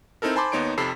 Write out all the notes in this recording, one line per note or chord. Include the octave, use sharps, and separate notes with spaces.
C4 D#4 E4 A4 A#4
C5 G#5 A5 B5 C6 D6
D#2 B3 D#4 C#5 C6 D7
F2 C3 A4 B5 C7